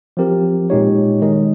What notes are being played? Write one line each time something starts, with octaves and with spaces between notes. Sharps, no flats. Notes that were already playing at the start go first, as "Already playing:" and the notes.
F3 C4 G4 A#4
A#2 G#3 D#4 G4 C#5
D#3 G#3 D#4 A#4 D#5